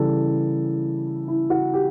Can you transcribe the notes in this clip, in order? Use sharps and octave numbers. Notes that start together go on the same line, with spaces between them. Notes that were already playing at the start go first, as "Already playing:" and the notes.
Already playing: C#3 E3 G3 A4
E4
F#4
G4